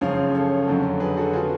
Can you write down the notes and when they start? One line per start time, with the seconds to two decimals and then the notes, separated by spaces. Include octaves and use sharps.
0.01 F#1 F#2 C#3 F3 C#5 F5
0.34 A4 C#5
0.67 F2 D3 F#3
1.00 G#4 B4
1.17 F#4 A4
1.33 D3 F4 G#4